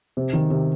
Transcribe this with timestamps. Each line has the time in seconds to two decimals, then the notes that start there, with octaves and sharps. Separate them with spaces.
0.17 C3
0.33 D#3
0.50 C3